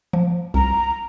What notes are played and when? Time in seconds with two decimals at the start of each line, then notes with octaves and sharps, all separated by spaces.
0.13 F3
0.54 C2 A#5